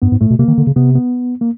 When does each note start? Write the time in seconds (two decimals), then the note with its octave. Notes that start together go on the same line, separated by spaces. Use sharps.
0.02 G2 B3
0.12 G#2
0.21 A2 A3
0.30 B2
0.39 C3 A#3
0.48 D#3
0.58 D3
0.67 C#3
0.76 C3 B3
0.95 B3
1.41 A#3